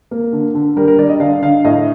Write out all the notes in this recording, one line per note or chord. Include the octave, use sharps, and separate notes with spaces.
A#3
D3
D3
G3 A#4
A#4
G3 D5
D#5
D3 F5
D3 F5
A2 D#5